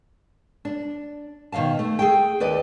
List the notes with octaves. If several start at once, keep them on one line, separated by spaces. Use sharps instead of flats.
D4
B2 D#3 C4 F5 A5
A3
G#4 A4 G5
D#2 B4 D5 D#5